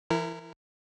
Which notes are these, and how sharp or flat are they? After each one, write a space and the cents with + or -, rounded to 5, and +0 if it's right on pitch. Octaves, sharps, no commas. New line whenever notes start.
E3 +30 E4 +0 A#4 -20